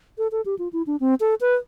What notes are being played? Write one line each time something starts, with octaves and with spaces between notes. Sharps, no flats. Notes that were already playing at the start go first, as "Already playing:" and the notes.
A4
A4
G4
F4
E4
D4
C4
A4
B4